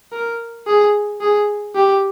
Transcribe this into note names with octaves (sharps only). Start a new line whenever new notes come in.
A#4
G#4
G#4
G4